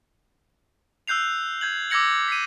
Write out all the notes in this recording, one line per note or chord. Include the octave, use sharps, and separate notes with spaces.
E6 F#6 G6 C7 F7
G6 G#6 F#7
D6 E6 G#6 A#6 C#7 F#7
B6 C7 D#7